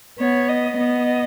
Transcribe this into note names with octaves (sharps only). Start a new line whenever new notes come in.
B3 C#5
D#5
B3 D#5